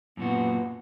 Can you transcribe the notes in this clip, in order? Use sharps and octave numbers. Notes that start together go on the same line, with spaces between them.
F#2 A#2 B3 F#4